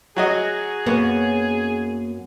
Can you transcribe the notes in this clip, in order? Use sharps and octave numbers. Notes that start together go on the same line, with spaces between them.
F#3 F#4 G#4 D#5
F#2 A#3 B3 C#4